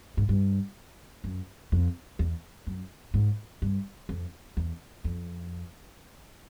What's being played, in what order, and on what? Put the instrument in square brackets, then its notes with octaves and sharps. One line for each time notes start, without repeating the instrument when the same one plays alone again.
[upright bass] G#2
G2
F#2
F2
E2
F#2
G#2
G2
F2
E2
F2